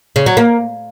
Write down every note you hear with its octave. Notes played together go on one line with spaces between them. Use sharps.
C#3
F#3
A#3